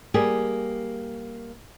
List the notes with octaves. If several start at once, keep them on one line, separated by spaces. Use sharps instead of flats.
G3 A#3 G4 G#4